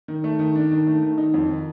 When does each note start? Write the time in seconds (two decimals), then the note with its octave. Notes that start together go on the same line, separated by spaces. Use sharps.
0.08 D#3
0.24 A3
0.39 D#3
0.55 D4
0.71 D#3
0.87 A3
1.02 D#3
1.18 D#4
1.34 F2
1.49 D#3